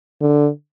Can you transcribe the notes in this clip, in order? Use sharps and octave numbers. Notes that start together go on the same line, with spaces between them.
D3